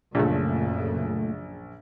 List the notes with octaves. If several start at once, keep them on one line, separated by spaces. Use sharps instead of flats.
A#1 F#2 A#2 C#3 A3